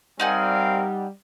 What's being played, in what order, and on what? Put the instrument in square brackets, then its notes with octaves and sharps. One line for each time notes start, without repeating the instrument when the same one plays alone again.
[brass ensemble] G3 [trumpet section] C4 A#4 F5 [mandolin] D#4 F#5 G#5